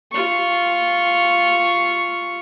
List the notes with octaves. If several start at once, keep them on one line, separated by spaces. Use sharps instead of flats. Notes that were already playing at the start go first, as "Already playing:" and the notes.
F4 C#6